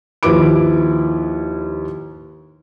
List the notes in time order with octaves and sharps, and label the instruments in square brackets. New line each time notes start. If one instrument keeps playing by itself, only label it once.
[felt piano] D#2 F3 E4 B4 D6 D7